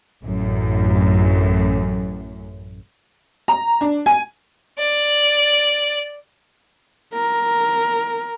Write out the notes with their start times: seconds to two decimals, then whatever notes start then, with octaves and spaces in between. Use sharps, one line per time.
0.23 A1 F#2
3.48 A#5
3.81 D4
4.06 G#5
4.79 D5
7.14 A#4